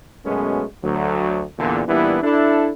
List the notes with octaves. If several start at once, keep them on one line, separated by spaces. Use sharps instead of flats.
F#2 B2 G#3 A3 B3 C#4
D2 F#3
E2 A#2 D3
A#2 E3 G3 B3 D4 E4
D4 E4 A4